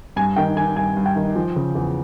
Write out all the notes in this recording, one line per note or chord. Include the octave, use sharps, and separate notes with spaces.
G2 G#5
D#3 G5
D#3 G#5
G2 G#5
G2
G5
D#3
F3
C#3
E2